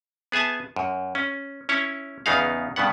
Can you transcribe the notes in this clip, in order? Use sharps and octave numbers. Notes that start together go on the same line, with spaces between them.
B3 G#4 E5 G#5 A5
F#2
C#4
C#4 E4 C#5
E2 C#3 B3 D#4 G#4 F5
G2 C#3 B3 F#5